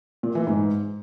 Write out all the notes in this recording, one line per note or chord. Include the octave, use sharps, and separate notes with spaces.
A#2
E3
G#2